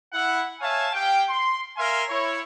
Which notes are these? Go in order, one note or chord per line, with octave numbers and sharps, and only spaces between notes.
E4 F#5
C#5 E5 F5 G#5 A5
G4 F5 G5
C6
A#4 E5 F5 G#5 C6
E4 C#5